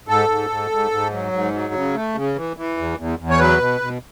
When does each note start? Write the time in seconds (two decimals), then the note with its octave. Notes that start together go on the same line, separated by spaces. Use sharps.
0.08 G#2 A4
0.29 G#2
0.50 G#2
0.71 G#2
0.91 G#2
1.12 F#3
1.32 G#2
1.53 F#3
1.74 C#3
1.95 A3
2.15 C#3
2.36 E3
2.57 E3
2.77 E2
2.98 E2
3.19 E2
3.30 C#5
3.39 F#3 B4
3.60 B2
3.81 B2